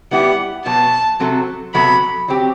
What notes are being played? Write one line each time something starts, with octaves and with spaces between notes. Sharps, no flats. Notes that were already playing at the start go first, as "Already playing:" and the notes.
G3 B3 E4 G4 F#5
B2 F#3 B3 A5
C3 F#3 C4 F#4 A4
C3 F#3 B3 F#4 A4 B5
F#3 C4 G4